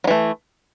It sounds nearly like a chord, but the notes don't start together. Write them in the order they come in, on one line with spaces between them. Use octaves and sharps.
F#3 E3 A3